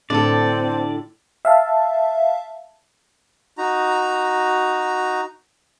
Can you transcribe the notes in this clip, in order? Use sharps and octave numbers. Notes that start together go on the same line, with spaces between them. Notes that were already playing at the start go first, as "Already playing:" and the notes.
A2 D3 C4 D4 A4 D5
E5 F5 A5
D#4 F#4 A#5